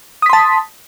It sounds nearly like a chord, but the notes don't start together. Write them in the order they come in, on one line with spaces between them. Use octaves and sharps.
D#6 B6 C6 A5